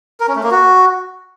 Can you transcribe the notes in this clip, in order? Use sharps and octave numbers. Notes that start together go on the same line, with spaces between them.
A#4
C#4
A3
A#3
F#4